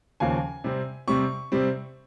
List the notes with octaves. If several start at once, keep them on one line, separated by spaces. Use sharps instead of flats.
D#2 C#3 F3 A#3 G#5
C3 G3 C4
C3 G3 C4 C#6
C3 G3 C4